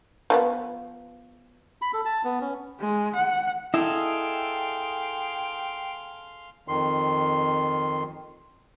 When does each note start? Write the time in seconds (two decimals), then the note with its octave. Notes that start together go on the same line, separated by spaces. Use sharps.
0.30 F3 A#3 B3
1.82 B5
1.94 A4
2.05 A5
2.24 B3
2.41 C#4
2.80 G#3
3.16 F#5
3.74 E4 G#4 A4 D#5 F5 G5 C6
6.68 F2 D#3 C6